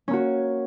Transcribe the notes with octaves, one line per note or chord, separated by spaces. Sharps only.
A#3 C#4 F#4